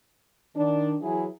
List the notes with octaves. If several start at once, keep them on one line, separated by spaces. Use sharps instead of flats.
D#3 D4
E3 F#3 E4 G#4